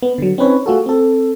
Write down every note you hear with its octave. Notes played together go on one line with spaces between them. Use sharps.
B3
D3 F#3
C4 C#4 D#4 B4 C#5
A3 F4 F#4 G#4 A4
C4 A4